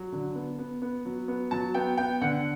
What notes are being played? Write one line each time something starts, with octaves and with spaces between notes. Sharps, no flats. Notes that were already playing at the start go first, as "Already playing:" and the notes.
Already playing: F#3
D3
B3
B3
B3
F#3
B3
F#3 A5
B3 G5
B3 G5
D3 F#5